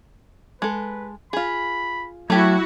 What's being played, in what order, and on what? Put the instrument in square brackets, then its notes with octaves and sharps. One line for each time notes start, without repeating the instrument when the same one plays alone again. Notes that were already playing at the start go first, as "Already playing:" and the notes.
[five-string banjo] G#3 A4 [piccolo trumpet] B4
[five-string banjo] F4 G#4 [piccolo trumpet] B5
[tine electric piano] F#3 [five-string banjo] A3 G4 [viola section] E4 F#4 [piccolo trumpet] G#6